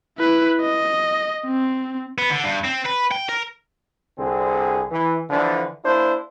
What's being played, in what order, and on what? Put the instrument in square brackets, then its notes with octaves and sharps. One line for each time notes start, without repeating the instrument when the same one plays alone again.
[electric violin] E4 B4
D#5
C4
[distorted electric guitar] B3
D3
G2
C4
B4
G5
A#4
[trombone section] C2 D3 C4 G#4
E3
D3 E3 F3 D4
A#3 D4 E4 C5